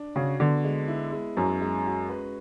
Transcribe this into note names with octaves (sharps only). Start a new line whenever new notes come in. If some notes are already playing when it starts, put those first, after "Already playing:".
Already playing: D4
C#3 F#4
D3 B3
G#3
E4
G#3
F#2 F#3 C#4
G#3
F#4
B4